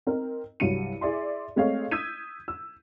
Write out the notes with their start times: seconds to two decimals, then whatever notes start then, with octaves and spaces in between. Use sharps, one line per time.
0.07 C4 D#4 A#4
0.60 C2 G2 F#3 C#7 D#7
1.01 E4 G#4 D5 E5 C6
1.56 G#3 A3 C4 C#5 D#5 F5
1.91 D#6 E6 G6 G#6 B6 D#7
2.48 E6